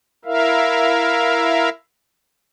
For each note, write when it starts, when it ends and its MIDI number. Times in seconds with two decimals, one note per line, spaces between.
0.25 1.69 64
0.25 1.69 70
0.25 1.69 76
0.25 1.69 77